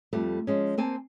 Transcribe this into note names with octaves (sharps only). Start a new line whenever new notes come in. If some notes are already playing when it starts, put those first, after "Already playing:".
F2 G3 A3
F3 G#3 C#4
A#3 C4 G#5 A5